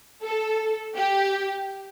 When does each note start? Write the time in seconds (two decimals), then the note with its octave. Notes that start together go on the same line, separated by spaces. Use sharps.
0.23 A4
0.96 G4